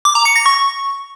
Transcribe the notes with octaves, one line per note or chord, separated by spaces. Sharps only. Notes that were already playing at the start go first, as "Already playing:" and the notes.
D6
A#5
C#7
A#6
C#6